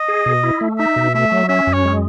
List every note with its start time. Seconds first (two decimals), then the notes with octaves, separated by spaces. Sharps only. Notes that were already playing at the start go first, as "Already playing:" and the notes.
Already playing: D#5
0.08 G#4
0.26 B2
0.43 E4
0.61 A3
0.79 D#4 E5
0.96 B2
1.14 A3 E5
1.32 F#3
1.49 C#4 E5
1.67 F#2
1.73 C#5
1.85 G#3